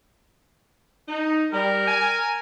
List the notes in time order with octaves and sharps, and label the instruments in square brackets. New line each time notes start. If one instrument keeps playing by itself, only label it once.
[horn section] D#4
[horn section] G3 [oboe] A#4
[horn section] G#5